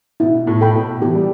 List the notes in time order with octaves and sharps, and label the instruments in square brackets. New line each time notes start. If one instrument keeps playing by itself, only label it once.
[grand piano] B2 [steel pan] E4
[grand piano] A2
[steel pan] A4 G5 B5
[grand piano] B2
[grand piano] E3 [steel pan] G4
[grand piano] G3